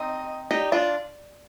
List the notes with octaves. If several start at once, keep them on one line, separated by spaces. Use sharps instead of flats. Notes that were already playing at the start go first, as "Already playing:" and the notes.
Already playing: C4 D#4 D#5
D#4 G4 D5
D4 F4